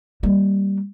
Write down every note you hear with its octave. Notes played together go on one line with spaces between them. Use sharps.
G3 A#3